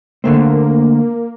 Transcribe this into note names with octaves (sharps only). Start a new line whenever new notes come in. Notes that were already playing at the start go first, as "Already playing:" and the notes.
D3 A3 A#3 C4